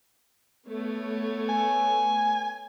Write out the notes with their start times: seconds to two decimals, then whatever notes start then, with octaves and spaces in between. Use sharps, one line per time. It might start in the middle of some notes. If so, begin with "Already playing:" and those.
0.69 A3 B3 C#5
1.49 G#5